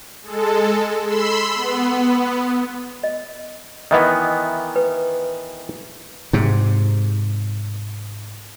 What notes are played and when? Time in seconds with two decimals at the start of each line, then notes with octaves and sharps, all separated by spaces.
0.23 G#3 A4
1.04 B5 C6 E6
1.55 B3
3.03 D#5
3.91 D#3 E3 B3 D#5 E5
4.76 B4
6.33 G#2 C3